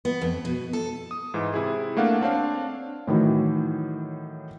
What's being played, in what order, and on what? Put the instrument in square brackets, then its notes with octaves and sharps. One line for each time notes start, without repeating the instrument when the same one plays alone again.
[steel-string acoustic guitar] B3
F2
B2
A4
[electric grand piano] D#6
G#2 E3
C3 E4 G#4
A3 A#3 D4 F5 F#5
C4 D4 C#5 F5
[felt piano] A2 D#3 E3 F#3